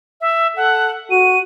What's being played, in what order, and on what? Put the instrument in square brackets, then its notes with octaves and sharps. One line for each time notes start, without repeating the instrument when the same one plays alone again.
[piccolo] E5
[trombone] A4 [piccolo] F#5
[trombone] F#4 [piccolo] D#7